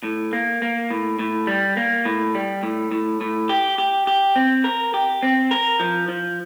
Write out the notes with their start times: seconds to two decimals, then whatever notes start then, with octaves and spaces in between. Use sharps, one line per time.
0.03 A2
0.33 A#3
0.62 A#3
0.91 A2
1.19 A2
1.47 G3
1.77 A#3
2.05 A2
2.35 G3
2.63 A2
2.91 A2
3.21 A2
3.49 G4
3.78 G4
4.07 G4
4.36 C4
4.64 A#4
4.94 G4
5.23 C4
5.51 A#4
5.80 F3
6.09 F3